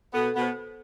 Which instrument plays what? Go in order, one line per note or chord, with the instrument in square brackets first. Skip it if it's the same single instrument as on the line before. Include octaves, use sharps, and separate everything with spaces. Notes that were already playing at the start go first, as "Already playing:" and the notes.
[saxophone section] B2 B3 [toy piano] A4
[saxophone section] B2 B3
[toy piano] C5